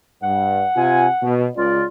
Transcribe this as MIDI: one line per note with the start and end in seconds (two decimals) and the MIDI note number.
0.23 0.64 43
0.23 1.44 78
0.76 1.06 48
0.76 1.06 65
0.76 1.06 80
1.23 1.47 47
1.56 1.83 37
1.56 1.85 65
1.56 1.83 74